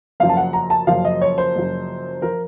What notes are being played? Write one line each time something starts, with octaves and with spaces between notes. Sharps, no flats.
F#1 F#2 F3 F5
A5
F#5
A#5
A5
F#1 F#2 F3 F5
D#5
C#5
C5
F#1 F#2 F3
F3 A#4